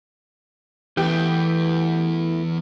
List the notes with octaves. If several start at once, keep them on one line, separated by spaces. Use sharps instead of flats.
E2 E3 A3 G4